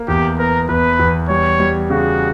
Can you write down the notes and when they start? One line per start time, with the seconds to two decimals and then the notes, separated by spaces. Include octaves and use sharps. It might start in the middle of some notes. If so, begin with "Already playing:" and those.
Already playing: A#3
0.08 E2 G4
0.39 B3 A#4
0.69 E2 B4
0.99 E2
1.29 G3 C#5
1.60 G3
1.90 C#3 F#4